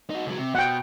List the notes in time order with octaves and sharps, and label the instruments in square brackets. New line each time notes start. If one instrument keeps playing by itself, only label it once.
[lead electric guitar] D#4 F#4
C#2 F#3
C3
[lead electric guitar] B2 [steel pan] F#5 G5